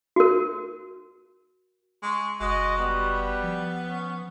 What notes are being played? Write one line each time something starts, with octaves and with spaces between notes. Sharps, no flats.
F#4 A#4
G#3 C#6
F#1 G#3 F#4 D#5
G3 B3
F3
C#4